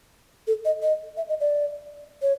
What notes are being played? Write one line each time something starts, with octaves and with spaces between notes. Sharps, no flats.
A4
D#5
D#5
E5
D#5
D5
C#5